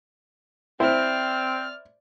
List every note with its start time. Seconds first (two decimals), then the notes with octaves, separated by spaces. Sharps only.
0.80 C4 E4 C5 D5 F6